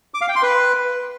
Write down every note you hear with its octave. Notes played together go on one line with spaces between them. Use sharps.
D6
F5
G5
C6
B4